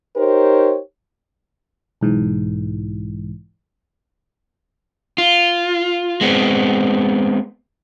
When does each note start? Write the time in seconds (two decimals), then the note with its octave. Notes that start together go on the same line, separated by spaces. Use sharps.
0.17 D#4 G4 A#4 C5 C#5
2.01 B1 G#2 E3
5.18 F4
6.21 G#3 B3 C4